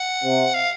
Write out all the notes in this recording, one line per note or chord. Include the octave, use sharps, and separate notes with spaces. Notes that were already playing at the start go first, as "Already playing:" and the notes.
Already playing: F#5
C3
F5